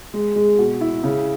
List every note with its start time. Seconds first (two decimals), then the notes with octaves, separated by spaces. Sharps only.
0.14 G#3
0.36 G#3
0.59 B2
0.81 E4
1.04 C#3